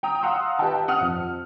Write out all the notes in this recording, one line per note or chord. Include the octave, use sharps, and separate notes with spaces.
G5 A#5 D#6
F5 F#5 A#5 C6 D#6 E6
G4 B4 D#5 F#5 G5 A5
F#5 D#6 F6
F2